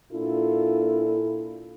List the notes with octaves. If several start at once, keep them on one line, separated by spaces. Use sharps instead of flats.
A#2 D4 E4 F4 A4